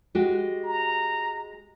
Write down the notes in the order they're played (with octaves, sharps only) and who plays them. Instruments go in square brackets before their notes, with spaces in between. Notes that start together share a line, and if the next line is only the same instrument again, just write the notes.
[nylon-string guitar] G#3 F#4 G4
[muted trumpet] A#5